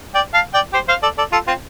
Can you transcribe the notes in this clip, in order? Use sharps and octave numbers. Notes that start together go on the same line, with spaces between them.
D5 G5
F5 A5
D5 G5
G4 C5
C5 F5
A4 D5
A4 D5
F4 A4
C4 F4